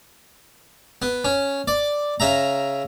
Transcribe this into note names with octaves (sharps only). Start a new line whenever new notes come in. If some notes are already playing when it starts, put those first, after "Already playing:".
B3
C#4
D5
C#3 E5 A#5